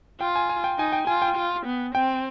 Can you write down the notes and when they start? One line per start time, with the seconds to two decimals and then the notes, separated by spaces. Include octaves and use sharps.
0.20 F4 G5
0.36 G#5
0.49 G#5
0.64 G5
0.78 D#4 G#5
0.93 G5
1.07 F4 G#5
1.22 G5
1.36 F4
1.65 B3
1.94 C4 G5